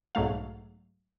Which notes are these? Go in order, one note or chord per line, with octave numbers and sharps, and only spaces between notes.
B1 G#2 F#3 A3 F5